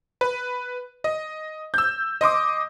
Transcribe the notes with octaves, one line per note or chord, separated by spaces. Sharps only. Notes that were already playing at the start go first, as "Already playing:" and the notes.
B4
D#5
E6 G6
D#5 C6 D6 D#6